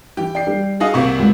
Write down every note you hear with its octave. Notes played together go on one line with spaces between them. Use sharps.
E3 G4
D5 G5 C7
G3
E4 F#4 G#4 D#5 F5
C2 C3 A#3 C#6
C#2